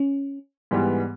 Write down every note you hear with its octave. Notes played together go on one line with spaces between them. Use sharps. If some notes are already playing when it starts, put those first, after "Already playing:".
Already playing: C#4
G#2 E3 G3 B3